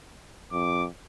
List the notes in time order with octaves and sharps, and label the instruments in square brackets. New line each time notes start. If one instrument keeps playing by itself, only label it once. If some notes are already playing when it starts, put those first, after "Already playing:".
[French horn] F2 [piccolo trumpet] D6